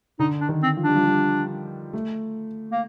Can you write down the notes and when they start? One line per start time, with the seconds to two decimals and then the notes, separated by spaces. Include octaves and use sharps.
0.19 D3 D#4
0.41 D4
0.49 D#3
0.63 C4
0.77 F3
0.84 G3 D4
0.96 F3
1.06 G3
1.93 A3
2.72 A#3